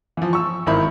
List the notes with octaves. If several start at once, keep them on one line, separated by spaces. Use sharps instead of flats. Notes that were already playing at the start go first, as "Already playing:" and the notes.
E3 F3
C#6 E6
G#1 D#3 E4 B5